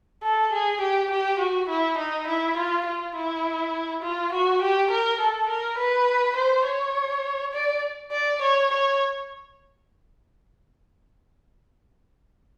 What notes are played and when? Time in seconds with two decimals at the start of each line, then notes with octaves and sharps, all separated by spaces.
0.23 A4
0.53 G#4
0.81 G4
1.11 G4
1.39 F#4
1.69 E4
1.98 D#4
2.27 E4
2.57 F4
2.86 F4
3.15 E4
4.03 F4
4.32 F#4
4.62 G4
4.91 A#4
5.20 A4
5.49 A#4
5.78 B4
6.37 C5
6.66 C#5
7.53 D5
8.12 D5
8.42 C#5
8.71 C#5